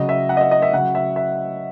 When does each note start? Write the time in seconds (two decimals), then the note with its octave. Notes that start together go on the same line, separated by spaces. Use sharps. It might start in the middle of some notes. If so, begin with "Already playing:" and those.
Already playing: C#3 F#3 D#5
0.09 E5
0.29 F#5
0.37 D#5
0.41 E5
0.51 D#5
0.62 E5
0.73 C#3 F#3 F#5
0.95 E5
1.16 E5